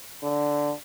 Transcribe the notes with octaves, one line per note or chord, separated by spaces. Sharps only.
D3